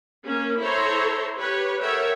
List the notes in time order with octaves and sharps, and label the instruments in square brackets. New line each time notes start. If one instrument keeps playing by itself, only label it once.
[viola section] A#3 C#4
E4 A4 C5 C#5 A#5 C6
G4 B4 C#5
A4 A#4 C#5 E5 F#5 G5